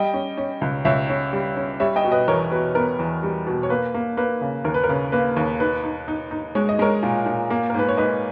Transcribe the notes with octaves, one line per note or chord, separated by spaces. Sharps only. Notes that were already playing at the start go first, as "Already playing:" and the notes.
Already playing: G3 D#5 G5
C#4
C#4
C#2
C#2 C#5 E5
C#4
G3
C#4
G3 C#5 E5
D#5 G5
B2
B4 D#5
E2 A#4 C#5
B2 B4
B3 A#4
E2
G3
B2
C#5
A#3 B4
A#3
A#3 B4
C#3
D#2 A#4
B4
A#4
C#3
A#3 B4
D#2
D#4 B4
D#4
D#4
D#4
G#3 C#5
D#5
G#3 A#4 C#5
A#2
A#2
A#3
A#4
G#2 B4
C#5
G#2 B4 D#5